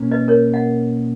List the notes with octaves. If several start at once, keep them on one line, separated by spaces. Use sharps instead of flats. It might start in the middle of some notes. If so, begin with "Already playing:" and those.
Already playing: B2 A#3 C#4
B4 D#5
A#4 C#5
D#5 F#5